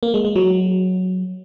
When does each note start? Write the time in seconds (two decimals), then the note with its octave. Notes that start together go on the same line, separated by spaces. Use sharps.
0.03 A#3
0.14 G#3
0.25 G#3
0.36 F#3